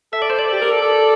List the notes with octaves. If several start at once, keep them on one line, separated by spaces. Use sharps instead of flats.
A4 E5
D5
C5
D5
G4
A#4
A4
A4